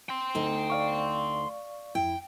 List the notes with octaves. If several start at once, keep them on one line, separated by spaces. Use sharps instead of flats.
G5 C6
D2 D#4
D5 F5 C#6
F2 E4 G5